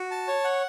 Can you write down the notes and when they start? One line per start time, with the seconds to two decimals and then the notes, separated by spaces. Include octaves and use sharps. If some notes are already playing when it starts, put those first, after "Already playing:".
Already playing: F#4
0.11 A5
0.28 C#5
0.44 F#5